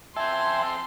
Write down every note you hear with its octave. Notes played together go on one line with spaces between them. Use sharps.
C4 A4 E5 G5 G#5 C6